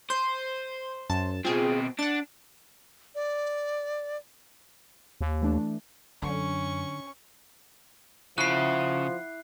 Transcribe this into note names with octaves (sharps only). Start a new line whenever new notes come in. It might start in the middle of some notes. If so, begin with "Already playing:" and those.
C5 C6 G6 D#7
F#2 A5
B2 C4 F4 G#4
D4 F#5 A6
D5
D#2
E3 A3 D4
F#2 D3 C#4 C#6
C#3 F3 E4 F#5 D6 F#6 C7